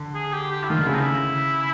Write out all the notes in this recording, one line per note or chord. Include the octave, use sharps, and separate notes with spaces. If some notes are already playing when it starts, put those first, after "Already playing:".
Already playing: D3
G#4
G4
G4
E4
D#3 F4
D3
C#3 E4
D#4
E4